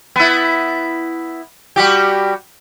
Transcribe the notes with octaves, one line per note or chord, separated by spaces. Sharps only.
B3 E4
G3 F#4 G4